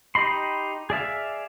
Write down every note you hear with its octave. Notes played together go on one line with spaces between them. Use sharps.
D#4 G4 D#5 B5 C6
G#4 D5 E5 F5